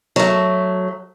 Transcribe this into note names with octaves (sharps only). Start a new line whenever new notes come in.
F#3 A3